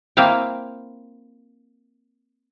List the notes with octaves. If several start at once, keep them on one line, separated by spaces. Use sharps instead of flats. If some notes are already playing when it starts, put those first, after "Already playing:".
A#3 C4 E4 F5 G5